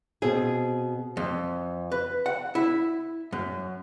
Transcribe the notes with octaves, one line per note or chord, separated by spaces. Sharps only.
B2 C4 G#4
F2
B4
F#5
E4
F#2